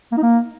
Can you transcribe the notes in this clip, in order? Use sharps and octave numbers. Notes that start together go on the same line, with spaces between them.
A#3
D#4
A#3